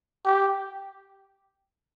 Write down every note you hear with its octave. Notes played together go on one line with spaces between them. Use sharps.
G4